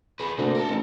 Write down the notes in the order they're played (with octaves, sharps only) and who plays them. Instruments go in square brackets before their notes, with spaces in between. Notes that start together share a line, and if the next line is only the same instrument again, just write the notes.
[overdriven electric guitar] G#4 B4
[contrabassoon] D2 [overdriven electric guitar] C3 A#3
[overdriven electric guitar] A4 A#4
[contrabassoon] A1